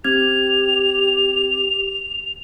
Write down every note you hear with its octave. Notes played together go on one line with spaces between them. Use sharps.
C4 G4 G#6 F7